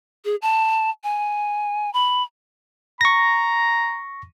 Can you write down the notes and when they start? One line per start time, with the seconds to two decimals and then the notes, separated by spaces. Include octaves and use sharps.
0.25 G#4
0.42 A5
1.04 G#5
1.94 B5
3.01 A#5 C#6 A#6